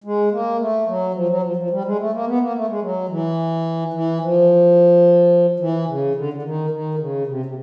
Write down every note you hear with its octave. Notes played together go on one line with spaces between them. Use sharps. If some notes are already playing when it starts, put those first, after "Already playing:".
G#3
A#3
A3
F#3
F3
F#3
F3
F3
G3
G#3
A3
A#3
B3
A#3
A3
G#3
F#3
E3
E3
F3
E3
C#3
D3
D3
D#3
D#3
D3
C#3
C3
C3